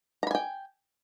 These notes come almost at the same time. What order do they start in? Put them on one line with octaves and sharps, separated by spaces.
A#5 B5 G#5 G5